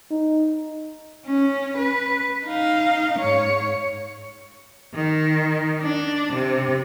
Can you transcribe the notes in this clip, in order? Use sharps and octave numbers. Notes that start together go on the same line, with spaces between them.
D#4
C#4
B4
D#4 F5
G#2 C#5
D#3
D4
C3